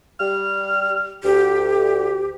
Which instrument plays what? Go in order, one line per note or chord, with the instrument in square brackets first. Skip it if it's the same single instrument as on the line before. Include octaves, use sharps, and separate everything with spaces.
[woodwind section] G3 F6
[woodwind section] D2 [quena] G4